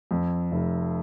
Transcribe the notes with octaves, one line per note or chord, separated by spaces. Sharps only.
F2
F1